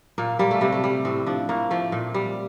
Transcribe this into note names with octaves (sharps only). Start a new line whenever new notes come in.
A#2 A#3
G3 A#3
A3
C3 G3
A3
G3
A2 C4
F3 D4
A2 A#3
F3 A3
A#2
G3